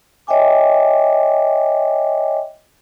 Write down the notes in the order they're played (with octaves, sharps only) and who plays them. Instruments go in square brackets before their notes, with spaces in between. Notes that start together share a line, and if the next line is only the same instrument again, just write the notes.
[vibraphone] C#5 D#5 E5 G5 G#5 D6